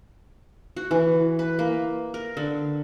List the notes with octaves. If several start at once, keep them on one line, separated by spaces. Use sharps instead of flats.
F#4
E3
B4
A#3
A#4
D3